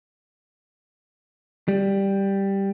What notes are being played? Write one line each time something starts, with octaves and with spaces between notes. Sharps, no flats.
G3